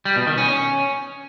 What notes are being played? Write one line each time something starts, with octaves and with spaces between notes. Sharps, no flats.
G3
B2
D#3
C#4
C#4